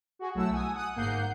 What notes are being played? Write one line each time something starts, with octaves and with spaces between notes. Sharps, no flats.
F#4 G#4
B1 F#3 A3 E4 F#5 E6
G#5 D#6
F#5 D#6
G1 G#2 A#3 F#5 G6 C7